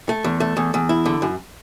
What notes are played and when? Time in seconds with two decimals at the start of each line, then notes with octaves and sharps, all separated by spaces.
0.09 A3
0.24 E2
0.40 A3
0.57 E2
0.74 E2
0.89 E4
1.06 D3
1.22 F#2